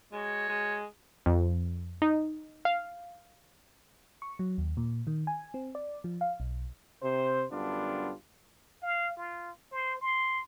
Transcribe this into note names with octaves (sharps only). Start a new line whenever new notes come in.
G#3 F#4 C#5
G#3
F2
D#4
F5
C#6
F#3
D#2
A#2
D#3
G#5
C4
D5
F3
F5
B1
C3 C5
F#2 D3 G3 B3 D4 F4
F5
F4
C5
C6